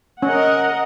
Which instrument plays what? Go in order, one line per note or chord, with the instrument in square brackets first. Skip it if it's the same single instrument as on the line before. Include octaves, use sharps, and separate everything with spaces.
[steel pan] C#4 [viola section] A#4 D#5 F#5